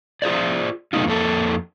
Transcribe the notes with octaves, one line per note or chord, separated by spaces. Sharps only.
F4 G#4 C5 D5
C3 F#3 A3 B3 D#4 F4
F2 A#3 A4